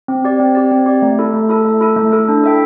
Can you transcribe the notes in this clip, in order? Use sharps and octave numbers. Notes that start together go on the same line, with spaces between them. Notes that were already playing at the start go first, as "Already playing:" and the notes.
C4
G4 D5
C4
G4 D5
C4
G4 D5
A3
E4 A4
A3
E4 A4
A3
E4 A4
A3
E4 A4
D4
A4 E5 G5